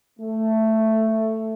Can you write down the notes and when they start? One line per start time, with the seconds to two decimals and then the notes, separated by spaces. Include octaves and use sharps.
0.19 A3